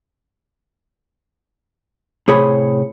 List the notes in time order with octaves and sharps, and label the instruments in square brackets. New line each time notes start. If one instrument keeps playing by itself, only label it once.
[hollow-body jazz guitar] A2 C3 G#4 C5 C#5 B5